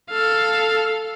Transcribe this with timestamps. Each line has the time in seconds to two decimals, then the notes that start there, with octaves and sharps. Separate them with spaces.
0.11 A4 F5